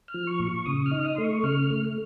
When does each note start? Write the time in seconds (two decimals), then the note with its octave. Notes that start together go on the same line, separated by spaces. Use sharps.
0.08 F6
0.14 F3
0.27 C#6
0.40 A#2
0.47 C#6
0.66 C#3 D#6
0.86 F6
0.91 D#4
1.05 D#6
1.15 A3 C6
1.24 C#6
1.43 C#3 F6
1.70 A3